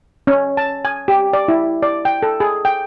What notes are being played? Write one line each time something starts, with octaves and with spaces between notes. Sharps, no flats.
C#4
A5
G#5
G4
D5
E4
D5
G5
A4
G#4
G5